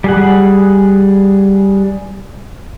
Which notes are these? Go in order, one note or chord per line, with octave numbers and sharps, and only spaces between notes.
G3 G#4 F#5